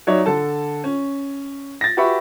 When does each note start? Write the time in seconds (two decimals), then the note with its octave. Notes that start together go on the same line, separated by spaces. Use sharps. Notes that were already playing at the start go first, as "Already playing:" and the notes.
0.07 F#3 D#4 C#5 D5 E5
0.26 D3 A4 A5
0.84 C#4
1.81 A6 A#6
1.97 F#4 G4 B4 E5 B5 C#6